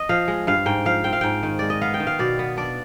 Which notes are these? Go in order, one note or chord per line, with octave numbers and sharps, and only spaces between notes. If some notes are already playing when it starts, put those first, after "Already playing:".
Already playing: D#5
F3 F5
G#3
G2 F5
G#2 G5
F3 F5
C4 G5
F5
G#2 G5
D#3
G#3 D5
D#5
B3 F5
G5
D#3
F5
B2 D5
B3
D4 D5